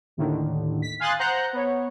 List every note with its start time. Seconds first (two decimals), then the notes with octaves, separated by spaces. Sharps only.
0.17 D#2 A2 D3 D#3
0.82 B6
1.00 F5 G#5 C6 D#6 F#6 A6
1.19 C5 F#5 A#5 F#6 G6
1.53 B3 C#5